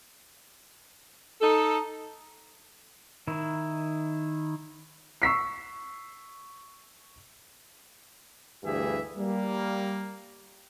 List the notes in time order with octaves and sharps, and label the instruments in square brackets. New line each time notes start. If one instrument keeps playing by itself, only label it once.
[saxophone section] D#4 A4
[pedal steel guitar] D#3 E4
[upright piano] C#6 E6 B6 C7
[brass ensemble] D2 G2 E3 G4 G#4 E5
G3 A#3